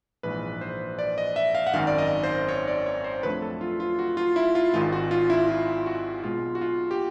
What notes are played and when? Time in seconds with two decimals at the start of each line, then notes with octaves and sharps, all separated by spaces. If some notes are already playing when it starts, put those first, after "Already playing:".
0.23 A#1 G#2 E3 B4
0.61 C5
0.99 D5
1.18 D#5
1.36 E5
1.55 F5
1.67 F#5
1.74 G#1 F#2 D#3 F5
1.87 D5
1.98 D#5
2.24 C5
2.48 C#5
2.68 D5
2.86 C#5
3.04 C5
3.23 F2 D3 F#3 A3 B4
3.42 A4
3.61 F4
3.80 F4
3.99 F#4
4.17 F4
4.36 E4
4.55 F4
4.73 G#1 G#2 D#3 G#3 F4
4.92 F#4
5.11 F4
5.30 E4
5.48 F4
5.86 F#4
6.23 B1 B2 G#3 F4
6.55 F#4
6.61 F4
6.91 G4